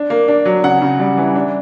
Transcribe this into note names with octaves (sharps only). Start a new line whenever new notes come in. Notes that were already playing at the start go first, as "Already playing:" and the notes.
Already playing: D4
A#3
D4
F#3
C#3 F#5
C#3
G3
E3
D4